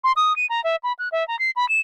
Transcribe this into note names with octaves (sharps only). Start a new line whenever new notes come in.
C6
D#6
D#7
A#5
E5
B5
F#6
E5
A#5
C7
B5
E7